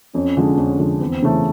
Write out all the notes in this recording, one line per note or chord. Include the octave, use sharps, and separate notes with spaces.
F2 C#4
D3 F3 G#3
F2
D3 F3 G#3
E2 C4
C#3 E3 A3